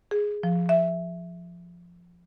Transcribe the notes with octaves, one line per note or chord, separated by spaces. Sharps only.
G#4
F3
E5